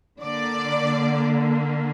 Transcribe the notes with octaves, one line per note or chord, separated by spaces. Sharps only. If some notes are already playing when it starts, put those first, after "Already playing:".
D3 A#3 D5